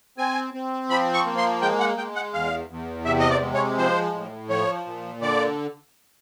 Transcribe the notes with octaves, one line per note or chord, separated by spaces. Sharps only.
C4 G#5
C4
F3 B5
C#6
A#3
C6
G#3 G5
F#5
G#3 G5
F#5
E2 F5
E2
C3 E5
D#5
D5
G#3
C#5
F3 C5
A2
F3 C#5
A#2
D3 D5